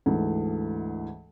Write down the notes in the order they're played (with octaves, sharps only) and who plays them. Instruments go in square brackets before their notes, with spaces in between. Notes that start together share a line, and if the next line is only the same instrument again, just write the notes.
[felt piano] D2 G#2 E3